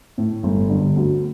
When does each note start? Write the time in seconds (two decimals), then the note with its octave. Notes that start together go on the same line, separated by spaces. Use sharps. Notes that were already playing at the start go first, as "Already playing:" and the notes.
0.18 A2
0.43 G1
0.69 G2 D3
0.96 D2